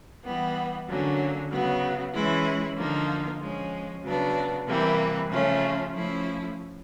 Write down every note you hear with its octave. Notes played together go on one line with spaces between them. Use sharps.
E3 G3 B3
D3 F#3 A#3 C#4
C#3 F#3 B3
E3 G#3 C#4 E4
D3 F3 A#3 D#4
F3 G#3 C#4
C#3 F#3 B3 D4
C3 E3 G3 A#3
C#3 F3 A3 C#4
F3 A3 C#4 E4